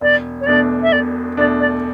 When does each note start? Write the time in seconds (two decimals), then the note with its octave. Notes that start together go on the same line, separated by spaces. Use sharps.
0.01 E1 D5
0.41 C#5
0.46 E2 B2 A3 D4 D5
0.83 E5
0.92 E1 D5
1.37 E2 B2 A3 D4 D5
1.60 D5